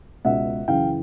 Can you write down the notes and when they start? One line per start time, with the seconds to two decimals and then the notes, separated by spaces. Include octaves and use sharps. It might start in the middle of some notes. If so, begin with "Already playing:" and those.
0.25 C#2 B2 E5 F#5
0.68 F#2 C#3 E3 F5 G5